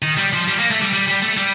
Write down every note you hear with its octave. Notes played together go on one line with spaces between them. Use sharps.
D#3
G3
F3
G3
A#3
A3
G3
G3
G3
A3
G3